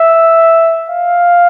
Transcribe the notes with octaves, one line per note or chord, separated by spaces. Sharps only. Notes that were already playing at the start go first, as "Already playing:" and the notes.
Already playing: E5
F5